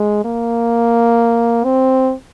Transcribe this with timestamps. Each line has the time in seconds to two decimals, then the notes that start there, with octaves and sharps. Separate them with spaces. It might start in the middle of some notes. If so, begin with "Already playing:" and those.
Already playing: G#3
0.25 A#3
1.64 C4